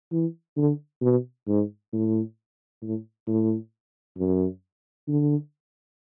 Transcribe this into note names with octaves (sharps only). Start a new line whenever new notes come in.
E3
D3
B2
G#2
A2
A2
A2
F#2
D3